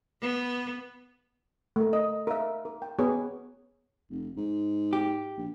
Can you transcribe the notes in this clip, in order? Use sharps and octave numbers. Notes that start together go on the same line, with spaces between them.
B3
A3 A#4
D#5
A#4 E5
A#4
G5
B3 G#4 B4 C#5
F1
G#2
G4
A#1